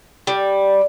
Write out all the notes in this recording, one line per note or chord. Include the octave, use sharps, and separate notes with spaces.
G3